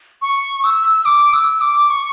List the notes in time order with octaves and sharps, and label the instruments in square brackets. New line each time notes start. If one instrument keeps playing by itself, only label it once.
[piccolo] C#6
E6
D6
E6
D6
C#6